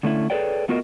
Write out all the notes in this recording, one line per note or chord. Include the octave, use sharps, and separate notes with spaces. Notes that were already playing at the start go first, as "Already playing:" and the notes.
D3 A3 C#4 E4
G#4 A4 B4 C#5 D5 G5
A3 B3 F4 F#4 A#4 D#5